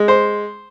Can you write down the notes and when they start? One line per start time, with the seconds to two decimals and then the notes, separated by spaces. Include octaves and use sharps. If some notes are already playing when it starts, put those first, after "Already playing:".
Already playing: G#3
0.08 C5